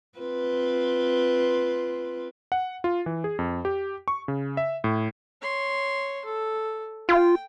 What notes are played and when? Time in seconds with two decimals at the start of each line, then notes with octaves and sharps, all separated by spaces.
0.19 C4 F4 B4
2.52 F#5
2.84 F4
3.06 E3
3.24 G#4
3.39 F2
3.65 G4
4.08 C#6
4.28 C#3
4.57 E5
4.84 A2
5.41 C#5 C6
6.25 A4
7.09 F4 G5